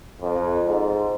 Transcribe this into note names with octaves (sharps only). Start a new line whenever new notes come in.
F2
G#2